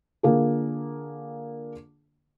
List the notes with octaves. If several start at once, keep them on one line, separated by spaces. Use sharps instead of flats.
D3 A#3 F4 G#4